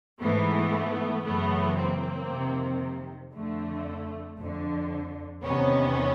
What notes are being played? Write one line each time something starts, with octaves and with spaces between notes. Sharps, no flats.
G#2 E3 A3 B3
F#2 C#3 E3 A3 B3
A#3 C4
F2 C3 D#3
F2 D3 A3
F2 D3
E2 C3 D#3 B3 C#4